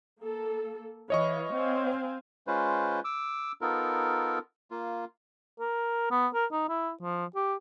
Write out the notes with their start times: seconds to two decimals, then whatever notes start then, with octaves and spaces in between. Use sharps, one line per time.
0.21 A#3 A4
1.10 E3 C#5 D#5 F5 C#6
1.52 C4 F5 G#5
2.47 G#3 C#4 F4 B4 C5
3.04 D6 E6
3.61 B3 D#4 F4 A4 A#4
4.71 A#3 F4
5.60 A#4
6.11 B3
6.34 A#4
6.52 D#4
6.69 E4
7.02 F3
7.35 G4